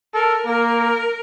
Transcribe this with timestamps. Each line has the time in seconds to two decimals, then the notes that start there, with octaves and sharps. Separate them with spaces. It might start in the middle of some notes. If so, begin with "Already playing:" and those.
0.13 A4 A#4
0.46 A#3 A#4